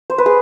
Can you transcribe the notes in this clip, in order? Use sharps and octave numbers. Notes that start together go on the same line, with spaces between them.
C5
B4
G#4